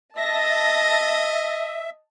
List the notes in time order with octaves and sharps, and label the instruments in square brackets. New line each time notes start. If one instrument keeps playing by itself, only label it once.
[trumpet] D#5 [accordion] E5 [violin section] A5 A#6